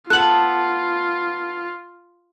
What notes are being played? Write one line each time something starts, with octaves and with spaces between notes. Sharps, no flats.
B3 F4 A4 F#6 F#7